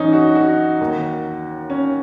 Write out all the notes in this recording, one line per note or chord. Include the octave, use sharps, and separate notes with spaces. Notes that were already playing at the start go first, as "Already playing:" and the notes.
Already playing: F#2 E3 C#4 D#4
F#4
F#4
D#2 D#3
C#4